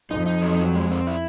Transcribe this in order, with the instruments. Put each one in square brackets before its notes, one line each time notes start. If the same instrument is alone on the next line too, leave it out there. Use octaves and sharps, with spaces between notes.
[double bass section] F2 [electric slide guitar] D#4
[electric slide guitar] D#4
F#3
F#3
G#3
C4
E4